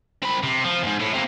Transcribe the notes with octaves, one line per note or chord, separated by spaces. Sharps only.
C4 B5
C3
F3
E2 G#2
A2
C3 A#3